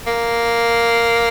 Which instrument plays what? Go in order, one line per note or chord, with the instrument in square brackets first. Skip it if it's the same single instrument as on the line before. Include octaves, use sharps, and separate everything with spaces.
[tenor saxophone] A#3